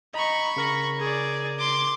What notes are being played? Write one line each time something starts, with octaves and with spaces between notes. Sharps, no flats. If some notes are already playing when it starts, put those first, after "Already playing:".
D#5 A#5 B5 C#6
C#3 A#4 A#6
G#4 D5
C6 D6